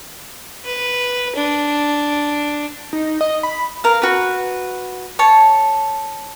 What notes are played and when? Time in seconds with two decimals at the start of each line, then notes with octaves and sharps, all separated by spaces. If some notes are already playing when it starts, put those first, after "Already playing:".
0.65 B4
1.36 D4
2.93 D#4
3.21 D#5
3.43 B5
3.84 A#4 F5
4.02 F#4 B4
5.19 C#5 A5